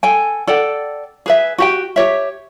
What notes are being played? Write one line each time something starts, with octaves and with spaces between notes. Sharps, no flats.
A4 G5 G#5
A4 D5 F#5 G5
G#4 B4 E5
F#4 G4 G5
G4 C#5 E5